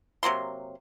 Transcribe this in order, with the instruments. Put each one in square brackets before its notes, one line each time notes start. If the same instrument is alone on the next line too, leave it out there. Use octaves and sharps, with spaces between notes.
[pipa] C3 F#3 A#3 C6